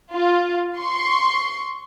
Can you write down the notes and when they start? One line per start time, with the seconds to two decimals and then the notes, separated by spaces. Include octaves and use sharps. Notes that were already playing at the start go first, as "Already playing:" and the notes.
0.13 F4
0.78 C6 C#6